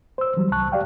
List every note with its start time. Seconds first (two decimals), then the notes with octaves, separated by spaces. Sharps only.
0.18 C5 E6
0.37 E3 F#3 G3
0.52 C2 A5 C#6 F#6
0.72 G4 D5 F5 G5